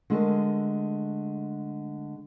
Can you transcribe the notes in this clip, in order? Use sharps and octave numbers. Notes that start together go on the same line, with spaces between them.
D3 G#3 A3 G#4 A#4 A5